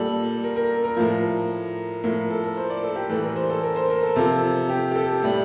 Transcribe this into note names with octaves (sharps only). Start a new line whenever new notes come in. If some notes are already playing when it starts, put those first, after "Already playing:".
Already playing: A#2 G3 A4
A#4
A#4
A#4
A2 F3
A2 F3 A#4
A4
A#4
C5
D5
A4
G4
A2 E3 G3 A4
A#4
C5
A4
A#4
C5
A#4
A4
C3 F3 A4
G4
G4
A4
A2 G3 G4